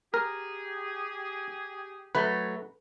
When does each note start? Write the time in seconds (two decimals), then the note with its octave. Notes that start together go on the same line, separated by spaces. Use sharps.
0.14 G4 G#4 A#4
2.15 F#3 A3 B4